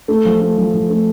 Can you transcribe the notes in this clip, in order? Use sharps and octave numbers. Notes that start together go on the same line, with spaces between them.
A3
F3
A3
F3
F3
A3